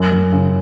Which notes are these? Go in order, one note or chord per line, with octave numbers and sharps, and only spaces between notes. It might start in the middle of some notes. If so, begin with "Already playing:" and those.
Already playing: F#2
F#2
C#3